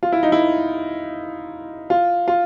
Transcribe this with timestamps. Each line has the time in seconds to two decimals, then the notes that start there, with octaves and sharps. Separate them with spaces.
0.03 F4
0.12 E4
0.23 D#4
0.32 E4
1.90 F4
2.28 F4